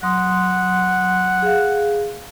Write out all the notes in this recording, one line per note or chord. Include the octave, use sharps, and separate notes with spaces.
F#3 F#5 C6 D#6
G#4 F5